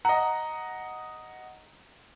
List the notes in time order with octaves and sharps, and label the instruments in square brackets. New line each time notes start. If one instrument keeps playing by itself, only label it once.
[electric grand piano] D#5 F#5 [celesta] A#5